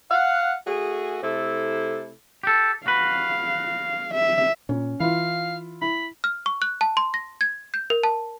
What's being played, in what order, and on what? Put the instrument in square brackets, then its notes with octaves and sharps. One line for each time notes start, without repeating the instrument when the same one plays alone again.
[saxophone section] F5 F#5
A3 F#4 G#4
C3 A3 E4 A4
[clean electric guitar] G4 A4
[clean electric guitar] F#4 B4 [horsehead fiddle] F5
[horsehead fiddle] E5
[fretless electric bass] A#2 [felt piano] C#4
[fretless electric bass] E3 [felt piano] E4 F4 [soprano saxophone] F5
[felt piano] E4 [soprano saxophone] B5
[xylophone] F6
C#6
F#6
A5
C6
A#6
G#6
G6
A#4
A5